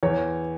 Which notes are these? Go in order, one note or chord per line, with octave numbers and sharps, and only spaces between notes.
E2 C#5